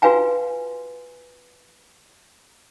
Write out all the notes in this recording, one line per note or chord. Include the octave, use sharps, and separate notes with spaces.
F4 F#4 B4 F5 G#5 A#5